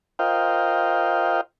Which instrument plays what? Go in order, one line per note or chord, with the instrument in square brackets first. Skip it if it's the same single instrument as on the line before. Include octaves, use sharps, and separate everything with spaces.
[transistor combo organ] F4 A#4 C5 D#5 F5 G5